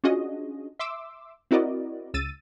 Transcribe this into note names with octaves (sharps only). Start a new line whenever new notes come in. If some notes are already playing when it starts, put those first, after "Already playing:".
C#4 D4 F4 F#4 G#4 D#5
E5 C6 D6 E6
C4 E4 F#4 A#4 D5 D#5
C#2 E6 A6 D#7